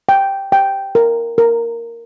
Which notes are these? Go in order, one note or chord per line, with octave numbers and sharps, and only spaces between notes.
G5
G5
A#4
A#4